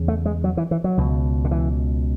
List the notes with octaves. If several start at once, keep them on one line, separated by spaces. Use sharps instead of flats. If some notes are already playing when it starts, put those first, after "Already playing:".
Already playing: E2 C#3
A3
G#3
F#3
E3
E3
F#3
C#2 B2
D3
E3